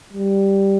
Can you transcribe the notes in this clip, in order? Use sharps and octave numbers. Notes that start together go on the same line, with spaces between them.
G3